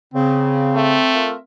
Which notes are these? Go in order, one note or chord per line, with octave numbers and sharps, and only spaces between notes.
C#3 C4
A3
F4 A#4 E5